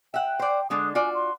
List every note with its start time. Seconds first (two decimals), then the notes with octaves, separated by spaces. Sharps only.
0.14 E5 F#5 G5
0.39 C5 D5
0.70 D3 G#3 D4 D#6
0.95 F4 F#4 D5 G#5
1.15 C6